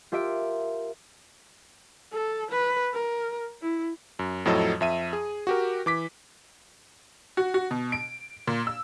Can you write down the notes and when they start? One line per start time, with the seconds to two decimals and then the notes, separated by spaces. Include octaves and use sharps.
0.12 F4 G4 A#4 E5 C6 D7
2.12 A4
2.51 B4
2.93 A#4
3.62 E4
4.19 F#2
4.45 F2 A2 F#3 A4 D#5
4.81 F2 E5 D#7
5.13 G#4
5.47 F#4 G4 A#4
5.86 E3 D6 B6
7.37 F#4
7.54 F#4
7.71 B2
7.92 D7
8.47 A#2
8.67 E6